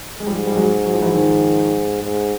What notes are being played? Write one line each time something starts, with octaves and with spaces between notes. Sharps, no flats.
G#3
G#2 F3 G3
G3
F#3 G#3
F#3
F3
E3 F#3
D#3 F3
G#2